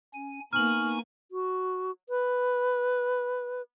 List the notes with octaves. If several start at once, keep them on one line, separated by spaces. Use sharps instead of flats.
C#4 G#5
A#3 B3 D#4 G#5 C#6 F6 F#7
F#4
B4